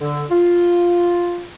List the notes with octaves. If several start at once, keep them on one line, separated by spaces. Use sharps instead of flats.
D3
F4